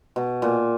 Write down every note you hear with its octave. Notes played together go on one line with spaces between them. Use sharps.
B2
A#2